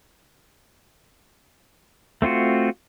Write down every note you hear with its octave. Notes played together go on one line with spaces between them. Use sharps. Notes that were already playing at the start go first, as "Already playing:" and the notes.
A3 C4 F4 F#4